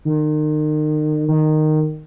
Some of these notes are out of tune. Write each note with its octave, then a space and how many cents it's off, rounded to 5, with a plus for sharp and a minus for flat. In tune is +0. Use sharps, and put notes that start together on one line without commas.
D#3 -35
D#3 -15